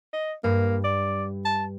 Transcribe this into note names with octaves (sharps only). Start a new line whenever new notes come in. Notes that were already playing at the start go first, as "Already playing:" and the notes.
D#5
G2 A#3
D5
A5